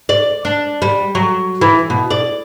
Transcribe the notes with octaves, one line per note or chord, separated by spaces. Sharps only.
D5
D4
G3
F#3
E3
B2
D5